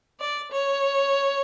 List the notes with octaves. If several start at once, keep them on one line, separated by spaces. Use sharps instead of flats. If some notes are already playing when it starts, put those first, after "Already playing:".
D5
C#5